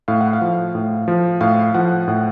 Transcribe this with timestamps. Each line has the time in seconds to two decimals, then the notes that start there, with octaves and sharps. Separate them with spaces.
0.08 A2 F5
0.21 F#5
0.33 F5
0.41 F3
0.75 A2
1.08 F3
1.41 A2 F5
1.74 F3 F#5
2.08 A2